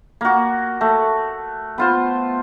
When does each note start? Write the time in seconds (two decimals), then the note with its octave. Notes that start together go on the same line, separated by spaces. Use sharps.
0.21 A#3 F#4
0.81 A3
1.78 B3 F4 C5